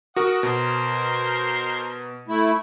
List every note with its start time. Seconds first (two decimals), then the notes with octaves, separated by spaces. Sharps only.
0.16 F#4 A#4 F#5 D#6
0.43 B2 A#4 C5
2.28 A3 E4